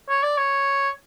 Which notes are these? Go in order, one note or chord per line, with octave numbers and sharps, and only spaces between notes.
C#5
D5
C#5